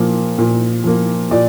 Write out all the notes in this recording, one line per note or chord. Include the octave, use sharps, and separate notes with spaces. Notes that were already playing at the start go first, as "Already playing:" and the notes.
Already playing: A#2 F3 A#3
A#2
F3 A#3
A#2 D5